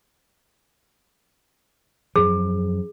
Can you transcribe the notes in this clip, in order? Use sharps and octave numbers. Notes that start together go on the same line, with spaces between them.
F#2 F3 G#4